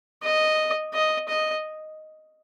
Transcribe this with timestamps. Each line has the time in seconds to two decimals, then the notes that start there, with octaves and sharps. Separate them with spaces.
0.23 D#5
0.93 D#5
1.28 D#5